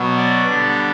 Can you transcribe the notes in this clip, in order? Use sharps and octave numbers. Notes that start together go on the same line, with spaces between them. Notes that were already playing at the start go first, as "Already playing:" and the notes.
Already playing: B2 F#3 B3
D5
D3 G3 B3 D4